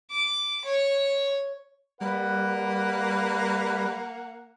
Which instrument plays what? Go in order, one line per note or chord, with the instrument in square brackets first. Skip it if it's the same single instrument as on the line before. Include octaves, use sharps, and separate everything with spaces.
[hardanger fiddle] D6
C#5
[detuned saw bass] G3 [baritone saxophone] A#3 [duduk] B4 [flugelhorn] F#5